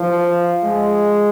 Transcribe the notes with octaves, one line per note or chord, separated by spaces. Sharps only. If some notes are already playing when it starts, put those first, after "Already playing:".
Already playing: F3
G#3